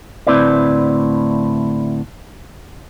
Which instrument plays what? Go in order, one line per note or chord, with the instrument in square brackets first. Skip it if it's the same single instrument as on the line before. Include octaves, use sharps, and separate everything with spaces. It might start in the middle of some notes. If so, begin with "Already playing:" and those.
[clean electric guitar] D2 A2 C4 E4 B4 D5